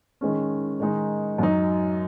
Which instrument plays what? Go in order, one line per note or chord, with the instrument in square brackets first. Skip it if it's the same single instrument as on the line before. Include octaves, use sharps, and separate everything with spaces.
[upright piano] D#3 G#3 C#4
D#3 G#3 D#4
F#2 F#3 D#4